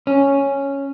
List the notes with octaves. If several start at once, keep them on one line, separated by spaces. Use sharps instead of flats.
C#4